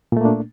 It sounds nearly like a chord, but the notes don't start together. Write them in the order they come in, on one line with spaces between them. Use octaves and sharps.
A#2 A3 A#3 D4